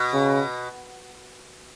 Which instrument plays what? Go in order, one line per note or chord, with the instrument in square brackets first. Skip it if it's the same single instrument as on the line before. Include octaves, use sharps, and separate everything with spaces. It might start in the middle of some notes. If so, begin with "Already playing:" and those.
Already playing: [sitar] B2
[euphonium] C#3